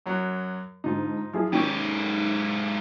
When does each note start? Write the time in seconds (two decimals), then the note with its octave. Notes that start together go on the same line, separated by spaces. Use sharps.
0.06 F#2 F#3
0.84 G#2 D3 D#4 F4
1.33 F3 F#3 E4 G#4
1.53 G#2 D#3 C#4 G4 G5 C#6